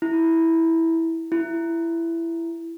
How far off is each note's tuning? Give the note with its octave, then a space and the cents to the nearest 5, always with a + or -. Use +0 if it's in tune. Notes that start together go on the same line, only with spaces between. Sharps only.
E4 -10
E4 +15